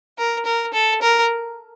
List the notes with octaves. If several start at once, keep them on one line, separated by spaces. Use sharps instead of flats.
A#4
A#4
A4
A#4